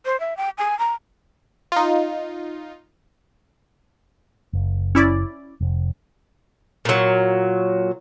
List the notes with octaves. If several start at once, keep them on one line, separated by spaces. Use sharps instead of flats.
C5
E5
G5
G#5
A#5
D#4 F4
F#1
C#4 E4 D5
F1
A#2 F#3